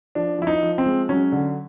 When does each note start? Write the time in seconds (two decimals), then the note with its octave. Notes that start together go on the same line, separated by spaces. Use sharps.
0.15 F3 D4
0.39 F3 E4
0.47 D#4
0.63 F3
0.78 C4
0.86 G#3
1.09 F#3 C#4
1.32 D3